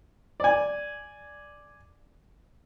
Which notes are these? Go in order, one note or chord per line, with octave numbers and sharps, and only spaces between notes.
D5 G#5